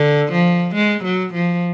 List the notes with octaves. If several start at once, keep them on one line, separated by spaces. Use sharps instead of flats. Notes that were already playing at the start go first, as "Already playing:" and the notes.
Already playing: D3
F3
G#3
F#3
F3